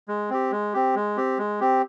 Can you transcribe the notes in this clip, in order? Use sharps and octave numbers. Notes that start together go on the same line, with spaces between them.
G#3
C4 G4
G#3
C4 G4
G#3
C4 G4
G#3
C4 G4